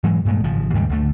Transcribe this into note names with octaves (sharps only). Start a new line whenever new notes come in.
G#2 E3 F#3 G#3
G2 A#2 G#3 A3
G#1 C#3 F3
D#2 G#2 C#3 G3
D2 D3 A3